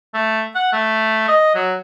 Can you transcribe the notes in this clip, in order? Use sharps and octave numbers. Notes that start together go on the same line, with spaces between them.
A3
F#5
A3
D#5
F#3